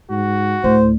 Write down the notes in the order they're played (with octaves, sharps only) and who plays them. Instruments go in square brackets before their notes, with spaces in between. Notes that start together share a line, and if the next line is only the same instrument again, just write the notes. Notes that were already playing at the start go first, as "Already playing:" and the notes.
[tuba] G#2 [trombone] F#4
[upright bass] D2 [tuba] A2 [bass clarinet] C5